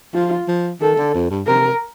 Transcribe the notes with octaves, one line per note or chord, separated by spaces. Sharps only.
F3 F4
F3
D#3 A4
D3
F2
G2
C3 A#4